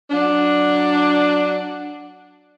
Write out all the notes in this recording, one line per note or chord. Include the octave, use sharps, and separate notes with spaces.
F#3 D4